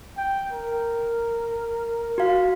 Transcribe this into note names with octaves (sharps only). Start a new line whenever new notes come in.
G5
A#4
F#4 F5